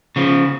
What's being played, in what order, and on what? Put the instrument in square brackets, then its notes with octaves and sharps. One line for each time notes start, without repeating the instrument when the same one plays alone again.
[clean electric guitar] C#3 F3